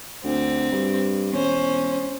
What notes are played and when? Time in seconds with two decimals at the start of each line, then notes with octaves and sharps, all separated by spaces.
0.24 D2 C4
0.71 G2
1.32 E1 C#4 C5